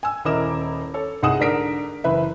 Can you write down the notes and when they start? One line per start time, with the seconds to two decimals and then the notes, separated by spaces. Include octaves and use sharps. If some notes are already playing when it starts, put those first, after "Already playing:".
0.03 G#5 E6
0.25 D#1 E4 A#4 D#5 D6 E7
0.94 A4 C#5
1.23 C2 D#4 G#4 F#5 D#6 E7
1.39 G#2 D3 D4 A#4 B6 D7
2.04 F#1 E3 B4 E5